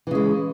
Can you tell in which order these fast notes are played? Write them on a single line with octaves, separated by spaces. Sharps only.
E3 C#3 G#3